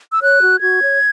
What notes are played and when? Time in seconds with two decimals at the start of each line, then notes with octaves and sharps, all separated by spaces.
0.11 E6
0.21 C#5 F#6
0.41 F#4
0.60 F#4 G#6
0.81 C#5